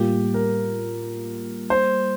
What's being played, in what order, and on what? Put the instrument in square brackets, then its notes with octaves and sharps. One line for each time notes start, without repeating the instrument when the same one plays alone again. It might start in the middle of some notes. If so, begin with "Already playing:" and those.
Already playing: [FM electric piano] A2 G3 A#3 F4 [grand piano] G4
[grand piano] A#4
C5